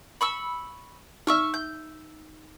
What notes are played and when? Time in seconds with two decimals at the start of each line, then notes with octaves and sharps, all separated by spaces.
0.21 B5 C#6 E6
1.27 D#4 E5 C#6 E6 F6
1.54 G6